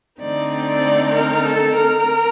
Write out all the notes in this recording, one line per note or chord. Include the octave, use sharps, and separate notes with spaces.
D3 A3 C4 D#4 D5
D5
A#4
A4
A#4